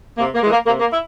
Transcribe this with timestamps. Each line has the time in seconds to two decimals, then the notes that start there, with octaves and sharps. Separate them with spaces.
0.18 C3 A#3
0.35 A#3
0.43 E3 G#3
0.51 A#3
0.67 C3 A#3
0.80 A#3
0.91 E4